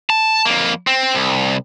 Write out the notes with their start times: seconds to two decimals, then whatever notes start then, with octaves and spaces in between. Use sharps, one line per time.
0.10 A5
0.45 F2 A#3
0.87 C4
1.15 C2